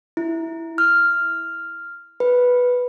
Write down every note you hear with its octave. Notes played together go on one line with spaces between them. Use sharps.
E4
F6
B4